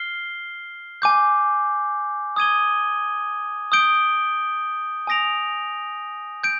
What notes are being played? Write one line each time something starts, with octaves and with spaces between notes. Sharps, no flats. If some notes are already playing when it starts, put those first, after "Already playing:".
Already playing: F6 C7 G7
G#5 D6 G6
D#6 G#6 D#7 G7
D#6 G6 D7 G7
G#5 D#6 A#6 D7 F7
G6 D7